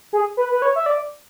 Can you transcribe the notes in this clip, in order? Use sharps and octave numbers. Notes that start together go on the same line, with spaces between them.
G#4
B4
B4
C#5
E5
D5